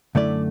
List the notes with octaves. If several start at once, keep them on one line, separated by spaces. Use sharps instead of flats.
F#2 D3 A3 E4 D5